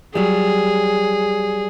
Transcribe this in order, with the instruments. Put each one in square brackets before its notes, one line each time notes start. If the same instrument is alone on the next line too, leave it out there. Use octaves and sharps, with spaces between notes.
[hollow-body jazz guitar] F#3 G3 [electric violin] G#4